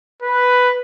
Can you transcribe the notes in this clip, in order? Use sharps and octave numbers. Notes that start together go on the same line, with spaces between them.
B4